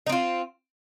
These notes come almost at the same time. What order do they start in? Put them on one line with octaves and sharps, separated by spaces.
D#4 C4 F4